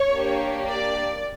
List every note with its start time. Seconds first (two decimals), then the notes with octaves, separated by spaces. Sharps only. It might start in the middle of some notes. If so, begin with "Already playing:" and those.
Already playing: C#5
0.11 A#3 D4 G4
0.67 D5